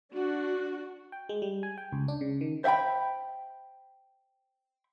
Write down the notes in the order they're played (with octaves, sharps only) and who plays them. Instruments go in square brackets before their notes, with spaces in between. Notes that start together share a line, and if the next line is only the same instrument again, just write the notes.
[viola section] D4 F#4
[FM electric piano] G5
G#3
G3
G#5
G5
C#2
D4
C#3
D#3
[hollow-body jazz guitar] C5 E5 F#5 G5 B5